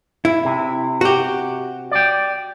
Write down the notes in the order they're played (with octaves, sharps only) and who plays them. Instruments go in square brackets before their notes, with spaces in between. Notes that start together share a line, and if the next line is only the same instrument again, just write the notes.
[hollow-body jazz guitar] E4
[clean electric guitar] C3
[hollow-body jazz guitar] F#4 G4
[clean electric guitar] D5 G5